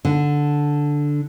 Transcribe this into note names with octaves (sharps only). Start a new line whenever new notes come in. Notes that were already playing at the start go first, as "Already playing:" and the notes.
D3